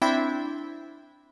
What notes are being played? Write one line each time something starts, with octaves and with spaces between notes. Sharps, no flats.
C4 D4 E4 E5 G5 B5